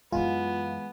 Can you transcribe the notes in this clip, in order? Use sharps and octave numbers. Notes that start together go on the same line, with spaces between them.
F#2 E3 G#3 B3 F4 G#5